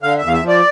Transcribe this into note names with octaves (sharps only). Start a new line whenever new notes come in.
D3 F5
E2 E5
F5
E5
F3
D5